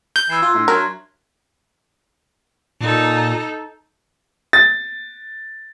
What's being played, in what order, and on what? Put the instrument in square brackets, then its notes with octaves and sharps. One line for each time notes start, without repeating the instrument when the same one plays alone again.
[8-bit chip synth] G6
[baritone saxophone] E3 [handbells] E6 G#6 C7
[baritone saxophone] F4 [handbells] C6 F#6
[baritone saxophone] A2 [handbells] D4 E5 A#5
[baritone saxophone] F#3 [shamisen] A#4 [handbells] C6 G#6
[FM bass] A#2 [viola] D#4 A4
[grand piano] A6